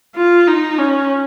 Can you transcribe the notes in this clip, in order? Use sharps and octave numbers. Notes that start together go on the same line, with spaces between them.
F4
D#4
C#4